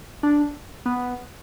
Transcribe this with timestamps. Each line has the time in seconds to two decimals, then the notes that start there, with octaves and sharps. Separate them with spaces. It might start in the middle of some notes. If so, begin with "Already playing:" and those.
0.23 D4
0.86 B3